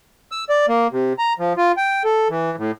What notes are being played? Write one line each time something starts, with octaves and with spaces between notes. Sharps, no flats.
E6
D5
A#3
C3
A#5
F3
F4
G5
A4
E3
A2